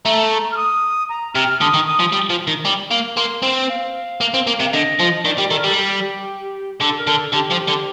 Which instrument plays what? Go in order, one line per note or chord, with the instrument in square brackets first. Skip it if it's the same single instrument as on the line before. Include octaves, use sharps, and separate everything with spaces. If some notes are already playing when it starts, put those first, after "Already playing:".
[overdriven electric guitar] A3 [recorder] A#5
[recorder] F6
D#6
A#5
[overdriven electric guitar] C3 [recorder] F6
[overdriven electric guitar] D3 [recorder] D#6
[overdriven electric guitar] D#3
[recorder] D#6
[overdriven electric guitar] F3
G3
F3
D#3
G3
A#3
[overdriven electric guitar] A#3 [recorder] C6
[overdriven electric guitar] C4
[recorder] F5
[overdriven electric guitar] A#3
C4
A#3
C3
[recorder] F5
[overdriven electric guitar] D3 [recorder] D#5
[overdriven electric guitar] F3
[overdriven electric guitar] D#3 [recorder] D5
[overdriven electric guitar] G3
[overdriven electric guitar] D#3 [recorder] A4
[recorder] A#4
[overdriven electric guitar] G3 [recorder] A4
[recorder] G4
[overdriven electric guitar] D3 [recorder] A4
[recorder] A#4
[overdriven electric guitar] D3
[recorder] A4
[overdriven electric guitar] D3 [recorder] G4
[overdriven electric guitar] F3
D3